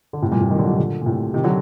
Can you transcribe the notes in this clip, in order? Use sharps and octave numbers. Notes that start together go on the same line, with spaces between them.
D3
A2 C3
G2 A#2
A2 C3
D#3 G3
D3 F#3
C3 D#3
A#2 D3
A#2
A2 C3
C3 D#3
D3 F#3